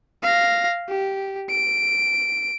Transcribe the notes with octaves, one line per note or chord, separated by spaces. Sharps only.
F5 A#6
G4
D7